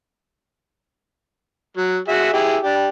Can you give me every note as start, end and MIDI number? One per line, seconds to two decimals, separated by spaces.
1.77 1.99 54
2.08 2.32 66
2.08 2.32 68
2.08 2.32 76
2.33 2.57 64
2.33 2.57 67
2.33 2.57 68
2.63 2.88 62
2.63 2.88 67